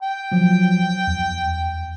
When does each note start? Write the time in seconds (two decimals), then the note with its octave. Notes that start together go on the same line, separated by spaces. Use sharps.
0.02 G5
0.32 F3 F#3
1.07 E2